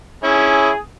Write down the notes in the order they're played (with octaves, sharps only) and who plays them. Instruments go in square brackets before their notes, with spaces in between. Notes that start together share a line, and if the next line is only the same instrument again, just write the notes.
[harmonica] C#4 E4 [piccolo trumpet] G#4